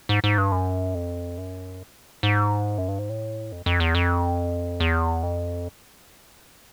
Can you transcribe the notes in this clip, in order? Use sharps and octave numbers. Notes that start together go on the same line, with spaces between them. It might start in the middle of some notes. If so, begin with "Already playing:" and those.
G#2
G#2
G2
F#2
F2
F#2
G#2
F#2
G2
G#2
A2
F2
F2
E2
F2
E2
F2